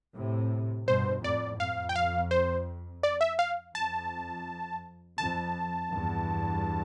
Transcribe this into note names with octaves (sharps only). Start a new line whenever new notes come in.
A2 C3
G2 B2 C5
F2 A2 D5
F2 F5
G5
F5
C5
D5
E5
F5
F2 A5
F2 A5
E2 G2